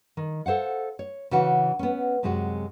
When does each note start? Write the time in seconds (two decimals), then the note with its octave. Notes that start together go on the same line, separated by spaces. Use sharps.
0.17 D#3
0.46 A4 C5 F5 F#5
0.99 C#5
1.31 C#3 E3 F#4 F#5
1.79 B3 C#4
2.23 F#2 C3 G#3 F#4